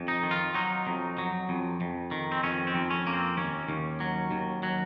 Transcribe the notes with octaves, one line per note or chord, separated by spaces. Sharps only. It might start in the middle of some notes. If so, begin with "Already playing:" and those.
Already playing: F2
D#4
D#3
F4
F#3 D#4
F2
F#3
F2
F2
D#3
C4
F2 C#4
C4
F2
C#4
A#3
C4
D#2 C#4
D#2
F#3
D#2
F#3